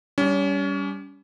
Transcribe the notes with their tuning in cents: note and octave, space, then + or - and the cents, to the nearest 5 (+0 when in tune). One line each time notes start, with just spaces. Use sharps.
G3 +0 C#4 +30